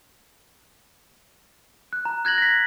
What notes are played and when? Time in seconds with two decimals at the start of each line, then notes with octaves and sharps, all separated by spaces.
1.93 F#6
2.05 A#5
2.25 F#6 G#6 A#6 F#7
2.38 A#6 B6